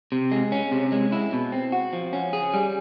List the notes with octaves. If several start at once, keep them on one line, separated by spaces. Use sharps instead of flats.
C3
G#3
C#4
C3
G#3
E4
B2
C4
F#4
F3
C#4
G#4
G3